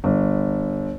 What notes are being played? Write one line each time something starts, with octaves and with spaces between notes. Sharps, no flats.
G1